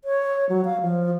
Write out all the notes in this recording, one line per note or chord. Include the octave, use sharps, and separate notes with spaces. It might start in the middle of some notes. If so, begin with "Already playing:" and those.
C#5
F#3
F5
F3